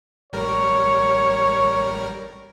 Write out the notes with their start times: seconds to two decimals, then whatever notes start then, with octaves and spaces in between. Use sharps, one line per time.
0.33 A1 G3 A#4 C#5